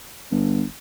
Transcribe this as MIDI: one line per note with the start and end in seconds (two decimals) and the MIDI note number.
0.31 0.64 31